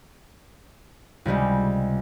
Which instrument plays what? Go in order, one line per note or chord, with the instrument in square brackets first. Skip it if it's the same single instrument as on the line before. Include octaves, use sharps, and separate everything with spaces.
[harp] C#2 C3 G3 G#3